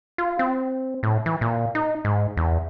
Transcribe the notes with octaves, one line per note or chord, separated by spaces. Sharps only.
F4
C4
A2
E3
A#2
D#4
G#2
E2